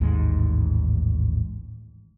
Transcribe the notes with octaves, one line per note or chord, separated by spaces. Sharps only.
A1 D#2 G#2 G#3